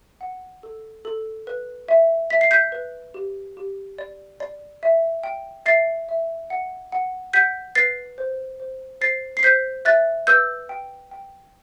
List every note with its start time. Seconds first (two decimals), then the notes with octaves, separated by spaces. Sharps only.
0.21 F#5
0.63 A4
1.05 A4
1.47 B4
1.88 E5
2.30 E5 B6
2.41 C7
2.51 G6 B6
2.72 B4
3.14 G4
3.57 G4
3.98 D5
4.40 D5
4.83 E5
5.23 G5
5.66 E5 A6 C7
6.09 E5
6.50 F#5
6.92 F#5
7.33 F#5 G6 B6
7.75 B4 A6 C7
8.18 C5
8.60 C5
9.01 C5 A6 C7
9.37 C7
9.43 C5 G6 B6
9.85 E5 F#6 A6
10.27 B4 E6 G6
10.69 G5
11.11 G5